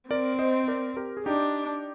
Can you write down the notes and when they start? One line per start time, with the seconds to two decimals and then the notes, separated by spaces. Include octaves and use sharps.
0.10 C4 A#4 D5
0.39 C5 D#5
0.68 A#4 D5
0.97 G4 A#4
1.17 G#4
1.26 D4 D#4 G4